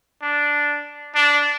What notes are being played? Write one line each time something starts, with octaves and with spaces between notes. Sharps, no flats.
D4
D4